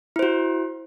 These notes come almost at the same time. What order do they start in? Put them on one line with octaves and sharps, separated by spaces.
E4 C5 F#4